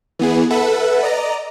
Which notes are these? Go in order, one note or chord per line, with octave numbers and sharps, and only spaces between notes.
E3 B3 G#4
A4 B4 E5 F#5
D5 D#5 A#5